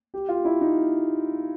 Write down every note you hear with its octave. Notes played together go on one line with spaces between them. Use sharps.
G4
F4
E4
D#4